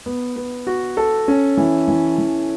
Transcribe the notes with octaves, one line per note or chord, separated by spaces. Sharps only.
B3
B3
F#4
A4
C#4
E3
E3
E3